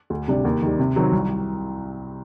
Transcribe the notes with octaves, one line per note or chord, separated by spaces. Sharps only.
D2
C3 G3 D4
D#2
D#3 G3
C3
D#3 F#3 C4
C2